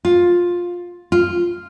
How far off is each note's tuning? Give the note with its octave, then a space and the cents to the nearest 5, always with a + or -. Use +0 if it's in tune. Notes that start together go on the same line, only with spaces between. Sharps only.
F4 +10
F4 -5